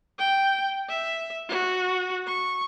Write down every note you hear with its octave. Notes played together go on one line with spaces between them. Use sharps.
G5
E5
F#4
C#6